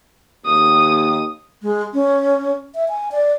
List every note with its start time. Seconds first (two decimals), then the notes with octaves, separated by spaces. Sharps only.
0.46 D#2 D#6
1.62 G#3
1.94 C#4
2.75 E5
2.88 G#5
3.12 D5